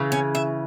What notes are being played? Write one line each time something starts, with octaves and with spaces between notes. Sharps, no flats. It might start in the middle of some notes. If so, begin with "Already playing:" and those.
Already playing: C#3 E3
C#4
E5